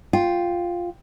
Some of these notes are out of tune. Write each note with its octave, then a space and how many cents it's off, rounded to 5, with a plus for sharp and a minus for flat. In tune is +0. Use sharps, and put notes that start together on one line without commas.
F4 +0 G5 +0